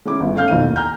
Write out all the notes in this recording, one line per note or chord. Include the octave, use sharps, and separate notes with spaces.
G#3 C#4 E4 D6
G1
A3 C#4 F5 F6 G6
A1 F2 B2 D#3 F5 D#7
D#2
G#5 A#5 F6 G6